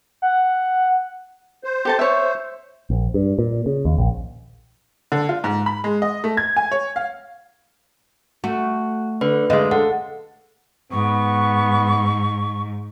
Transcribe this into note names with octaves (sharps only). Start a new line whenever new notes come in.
F#5
C5
G4 A4 A5
C#5 E5
A#1
G2
A#2
C#3
D#2
A#1
D3
F4
G#2
B5
G#3
D#5
A3
G#6
G#5
C#5
F5
A3 F#4
D3 B4
F#2 D3 G#3 F4 D#5
A4 F#5
G#2 B3 C#6